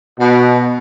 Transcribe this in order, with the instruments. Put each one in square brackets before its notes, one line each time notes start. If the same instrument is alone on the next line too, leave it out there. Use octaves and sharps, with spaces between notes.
[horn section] B2